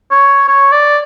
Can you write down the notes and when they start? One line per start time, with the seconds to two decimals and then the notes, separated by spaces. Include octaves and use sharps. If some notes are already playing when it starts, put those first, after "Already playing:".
0.11 C#5
0.48 C#5
0.72 D5